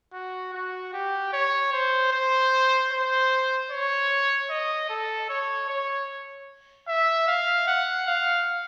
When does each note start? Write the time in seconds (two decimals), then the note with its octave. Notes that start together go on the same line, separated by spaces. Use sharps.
0.14 F#4
0.54 F#4
0.94 G4
1.33 C#5
1.73 C5
2.12 C5
2.92 C5
3.71 C#5
4.50 D#5
4.90 A4
5.30 C#5
5.69 C#5
6.88 E5
7.28 F5
7.68 F#5
8.07 F5